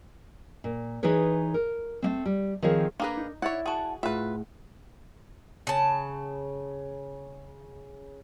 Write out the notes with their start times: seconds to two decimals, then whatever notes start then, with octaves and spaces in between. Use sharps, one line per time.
0.64 A#2
1.03 E3 D#4 G#4 B4 C#5
1.54 A#4
2.02 A3 A#3 C4
2.26 G3
2.62 D#3 F3 C4 G#4 C#5
3.00 A#3 D4 G#4 A#4 B4
3.17 D#4
3.42 E4 C#5 D5 E5 F#5
3.66 F#4 G#4 F#5 A5
4.03 A2 F4 G#4 B4 E5 F#5
5.67 C#3 A5